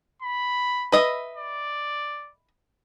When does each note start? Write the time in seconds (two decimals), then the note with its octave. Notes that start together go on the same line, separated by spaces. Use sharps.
0.22 B5
0.92 B4 D#5 E5
1.37 D5